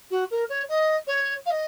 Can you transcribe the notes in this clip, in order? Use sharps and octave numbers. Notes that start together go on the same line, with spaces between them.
F#4
A#4
C#5
D#5
C#5
F5
D#5